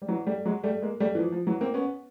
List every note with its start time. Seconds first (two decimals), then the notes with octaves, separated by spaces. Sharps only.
0.02 G3
0.08 E3 F#3
0.27 G3 A3
0.45 F#3 G#3
0.63 G3 A3
0.82 G#3 A#3
1.00 G3 A3
1.15 E3
1.19 F3
1.32 F3
1.47 E3 F#3
1.61 A#3 C4
1.74 B3 C#4